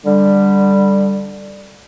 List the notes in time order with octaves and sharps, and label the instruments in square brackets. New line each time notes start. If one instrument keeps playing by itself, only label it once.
[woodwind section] D3 G3